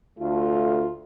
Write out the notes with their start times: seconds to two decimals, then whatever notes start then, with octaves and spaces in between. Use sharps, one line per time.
0.19 D2 A3 F4